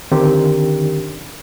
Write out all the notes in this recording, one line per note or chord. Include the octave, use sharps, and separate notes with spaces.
D3 D#3 C4 D4 G4 A#4